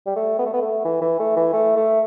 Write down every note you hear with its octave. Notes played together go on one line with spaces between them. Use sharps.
G3
A3
B3
A3
B3
A3
E3
E3
A3
E3
A3
A3